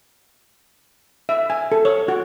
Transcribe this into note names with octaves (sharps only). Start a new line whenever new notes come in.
E5
G#5
A4
C#5
F#4